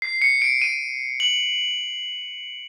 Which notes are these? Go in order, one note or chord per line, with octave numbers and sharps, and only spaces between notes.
C7
C#7
D7
D#7
F#7